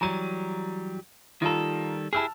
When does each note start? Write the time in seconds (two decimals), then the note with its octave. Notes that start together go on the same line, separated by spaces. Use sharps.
0.01 E3 F#3 G3 A#5 D#7
1.42 D#3 G3 F4 A4 A#5
2.13 E4 G4 G#4 A5 E6 F6